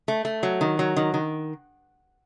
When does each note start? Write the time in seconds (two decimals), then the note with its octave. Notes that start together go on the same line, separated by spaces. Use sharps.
0.08 A3
0.25 A3
0.43 F#3
0.61 D#3
0.79 F#3
0.96 D#3
1.14 D#3